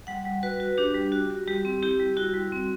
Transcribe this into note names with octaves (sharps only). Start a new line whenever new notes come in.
G3 F#5
G3
F#4 B4
F#4
D4 G4
G3
F#4
F#4
G3 G4
C4
E4 G4
G3
E4 F#4
G3
C4